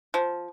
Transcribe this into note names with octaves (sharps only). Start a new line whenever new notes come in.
F3